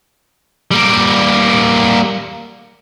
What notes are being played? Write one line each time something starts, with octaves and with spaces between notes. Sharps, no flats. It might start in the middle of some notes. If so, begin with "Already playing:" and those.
G3 A#3